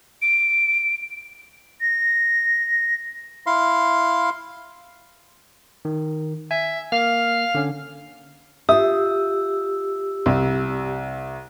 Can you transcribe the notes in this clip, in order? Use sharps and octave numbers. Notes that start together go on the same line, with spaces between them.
D7
A#6
E4 F5 C6
D#3
E5 G#5
A#3 F5 F6
D3 C#4
F4 G4 E5 D#6 E6
C2